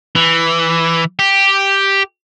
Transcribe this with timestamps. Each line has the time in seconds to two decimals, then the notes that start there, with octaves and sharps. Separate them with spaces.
0.15 E3
1.19 G4